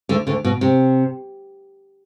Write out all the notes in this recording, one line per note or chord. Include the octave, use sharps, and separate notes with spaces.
D2 D3
D2 D3
B2
C3